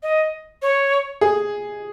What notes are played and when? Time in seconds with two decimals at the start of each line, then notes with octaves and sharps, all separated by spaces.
0.03 D#5
0.62 C#5
1.21 G#4